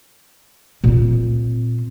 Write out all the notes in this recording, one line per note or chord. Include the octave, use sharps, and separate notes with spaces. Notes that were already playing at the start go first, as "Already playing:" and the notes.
A#2 C4